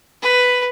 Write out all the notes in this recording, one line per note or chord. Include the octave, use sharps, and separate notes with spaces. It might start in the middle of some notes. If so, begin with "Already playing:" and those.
B4